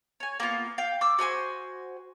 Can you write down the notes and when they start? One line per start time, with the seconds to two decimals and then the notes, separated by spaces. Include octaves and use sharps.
0.20 C#5 G#5
0.40 A#3 B3 F4
0.78 F5 G5
1.01 D6 E6
1.19 F#4 C5 G#5 C6